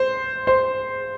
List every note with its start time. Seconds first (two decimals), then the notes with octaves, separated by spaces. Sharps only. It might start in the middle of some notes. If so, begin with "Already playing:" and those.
Already playing: C5
0.47 C5